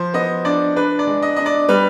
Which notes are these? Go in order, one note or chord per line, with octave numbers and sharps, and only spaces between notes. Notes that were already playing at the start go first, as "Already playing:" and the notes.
Already playing: F3 C5
B3 D#5
D4 D5
D4 B4
D5
G#3
D#5
D4 D#5
D5
G3 B4